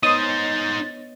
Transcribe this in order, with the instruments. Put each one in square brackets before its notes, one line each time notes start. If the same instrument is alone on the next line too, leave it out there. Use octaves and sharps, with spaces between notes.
[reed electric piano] B3 C#5 D#5 [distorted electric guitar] D#4 C5 [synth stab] D#6 [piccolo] A6